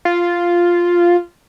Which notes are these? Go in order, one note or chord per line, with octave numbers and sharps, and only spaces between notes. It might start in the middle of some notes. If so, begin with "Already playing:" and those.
F4